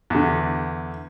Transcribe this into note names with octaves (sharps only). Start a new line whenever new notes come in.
E2 D3